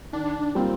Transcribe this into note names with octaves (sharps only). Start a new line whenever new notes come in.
D#3 D4
G3 A#3 C4 F4